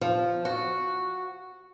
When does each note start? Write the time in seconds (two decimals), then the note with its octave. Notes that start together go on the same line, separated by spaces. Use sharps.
0.01 F3
0.45 F#4